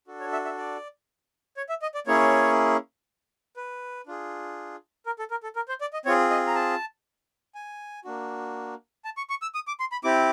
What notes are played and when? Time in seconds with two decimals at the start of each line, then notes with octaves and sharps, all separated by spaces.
0.07 D4 F#4 A4
0.20 C#5
0.33 E5
0.45 E5
0.58 D5
1.57 C#5
1.69 E5
1.82 D#5
1.95 D5
2.07 A#3 C#4 E4 G#4 C#5
3.57 B4
4.07 D4 F4 G#4
5.06 A#4
5.19 A4
5.31 A#4
5.43 A4
5.56 A#4
5.69 C5
5.81 D5
5.93 D#5
6.05 C4 F4 G#4 C#5
6.30 D#5
6.47 A#5
6.55 A5
7.55 G#5
8.05 A#3 D4 F#4
9.05 A5
9.17 C#6
9.30 C#6
9.42 E6
9.54 D#6
9.67 D6
9.80 C6
9.92 B5
10.04 C4 E4 G4 D6